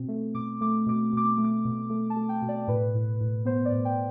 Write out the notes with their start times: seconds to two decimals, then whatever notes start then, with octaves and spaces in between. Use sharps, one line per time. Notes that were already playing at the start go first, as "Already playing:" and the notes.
Already playing: B2 C4
0.08 A3
0.34 B2 D6
0.61 A3 D6
0.86 B2 D6
1.13 B2 D6
1.38 A3
1.44 D6
1.65 B2
1.90 A3
2.10 A5
2.16 A3
2.29 G5
2.42 B2
2.48 D5
2.68 A2 B4
2.95 A2
3.20 A2
3.45 B3 C5
3.65 D5
3.72 A2
3.85 G5